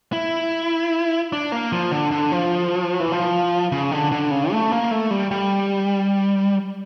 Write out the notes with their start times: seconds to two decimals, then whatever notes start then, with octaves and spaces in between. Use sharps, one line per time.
0.13 E4
1.33 D4
1.52 A#3
1.72 F3
1.91 D3
2.11 D3
2.32 F3
3.00 E3
3.12 F3
3.72 C#3
3.91 D3
4.12 D3
4.31 C#3
4.52 A3
4.72 A#3
4.91 A3
5.11 G3
5.31 G3